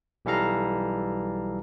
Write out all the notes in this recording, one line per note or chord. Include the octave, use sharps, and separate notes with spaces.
B1 E3 G3 A4 F5 A#5